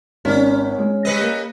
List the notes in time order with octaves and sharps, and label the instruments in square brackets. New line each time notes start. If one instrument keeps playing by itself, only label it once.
[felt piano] G#1 D5 [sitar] C#4
[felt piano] G#3
[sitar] G3 B4 D#5
[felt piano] A#3